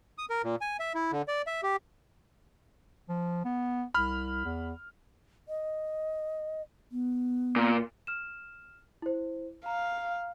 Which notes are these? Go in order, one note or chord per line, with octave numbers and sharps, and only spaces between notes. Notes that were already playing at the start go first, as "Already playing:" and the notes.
D#6
A#4
A#2
G#5
E5
E4
D3
D5
E5
G4
F3
B3
C2 B5 F6
E2
D#5
B3
A#2
F6 E7
E4 C5
F5 A#5